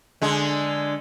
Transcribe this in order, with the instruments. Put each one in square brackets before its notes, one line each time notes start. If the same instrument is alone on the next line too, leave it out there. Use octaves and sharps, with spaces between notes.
[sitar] D3 G#3